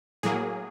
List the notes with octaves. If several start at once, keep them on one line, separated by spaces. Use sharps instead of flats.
A2 F#3 A#3 G#4